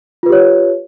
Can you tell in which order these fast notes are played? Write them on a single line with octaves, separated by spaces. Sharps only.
F4 B4 G4 C#5